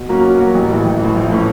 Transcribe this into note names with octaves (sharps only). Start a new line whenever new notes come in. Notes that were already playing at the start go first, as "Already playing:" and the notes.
Already playing: B2
F#3 A#3 C#4 F#4
B2
F#3 A#3 C#4 F#4
A1
A2 E3
A1
A2 E3
A#1
A2 E3 A3 C#4